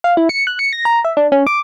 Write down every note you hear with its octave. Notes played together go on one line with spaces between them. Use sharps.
F5
E4
C#7
F#6
C#7
A#6
A#5
E5
D4
C#4
D6